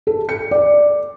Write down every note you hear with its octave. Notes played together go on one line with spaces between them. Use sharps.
A4
C#7
D5